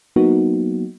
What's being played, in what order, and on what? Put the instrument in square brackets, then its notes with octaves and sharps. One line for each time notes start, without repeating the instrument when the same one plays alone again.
[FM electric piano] F#3 A#3 B3 D#4 F#4